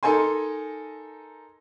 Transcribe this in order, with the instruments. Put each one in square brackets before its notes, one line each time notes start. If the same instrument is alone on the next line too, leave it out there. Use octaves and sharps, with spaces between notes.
[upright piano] D#4 A4 A#4 G#5 C6